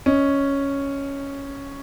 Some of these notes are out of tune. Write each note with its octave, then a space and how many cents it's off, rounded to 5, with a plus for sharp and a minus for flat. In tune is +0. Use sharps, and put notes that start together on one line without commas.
C#4 +0 D#5 +0